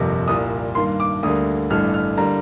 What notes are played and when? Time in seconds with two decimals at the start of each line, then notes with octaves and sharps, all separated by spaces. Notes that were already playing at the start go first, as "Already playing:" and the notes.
Already playing: G1 F2 C3 G3 A#3
0.28 C2 A#2 G3 D#6
0.75 G2 D#3 A#3 C6
1.00 D6
1.23 D2 D3 G3 A#3 D#6
1.70 A1 G2 D3 A3 F6
1.94 F6
2.17 D3 G3 A#3 A#5